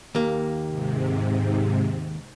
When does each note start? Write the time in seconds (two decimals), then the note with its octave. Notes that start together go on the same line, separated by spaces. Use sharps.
0.15 D#2 A#3
0.67 G#2 C3